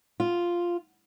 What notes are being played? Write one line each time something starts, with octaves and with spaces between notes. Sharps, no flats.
F4